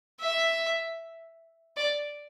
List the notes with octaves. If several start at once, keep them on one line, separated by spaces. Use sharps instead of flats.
E5
D5